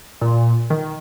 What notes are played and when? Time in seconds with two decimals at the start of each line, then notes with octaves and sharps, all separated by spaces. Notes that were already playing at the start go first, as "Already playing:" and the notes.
0.21 A#2
0.70 D#3